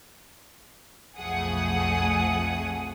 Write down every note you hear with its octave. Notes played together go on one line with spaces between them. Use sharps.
B1 F2 A3 G#4 F#5 D#6